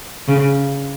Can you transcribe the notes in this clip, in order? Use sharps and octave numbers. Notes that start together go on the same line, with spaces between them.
C#3